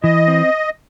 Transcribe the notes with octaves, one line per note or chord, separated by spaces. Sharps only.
E3 D#5
C4